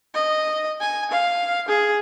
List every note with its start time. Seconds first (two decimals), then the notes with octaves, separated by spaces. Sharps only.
0.14 D#5
0.80 G#5
1.11 F5
1.68 G#4